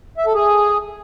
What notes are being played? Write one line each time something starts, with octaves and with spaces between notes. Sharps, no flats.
E5
A4
G#4